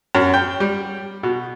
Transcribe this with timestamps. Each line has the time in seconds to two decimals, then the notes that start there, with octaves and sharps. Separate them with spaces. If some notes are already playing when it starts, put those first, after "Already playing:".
0.15 F#2
0.34 G5
0.60 G3
1.23 B2